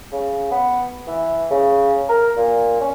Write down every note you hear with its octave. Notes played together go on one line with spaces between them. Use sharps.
C#3
B3
E3
C#3
A#4
A#2
C#4